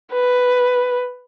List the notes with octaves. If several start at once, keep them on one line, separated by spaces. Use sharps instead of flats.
B4